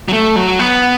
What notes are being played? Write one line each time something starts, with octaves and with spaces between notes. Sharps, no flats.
F#3
A3
F#3
B3